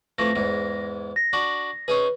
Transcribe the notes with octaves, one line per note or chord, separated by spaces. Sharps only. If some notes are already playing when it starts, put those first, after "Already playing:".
F2 E3 A3 A#6
E2 G#2
A#6
D4 F#4
C#4 D#4 G#4 B4